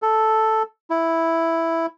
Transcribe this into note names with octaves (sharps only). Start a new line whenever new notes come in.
A4
E4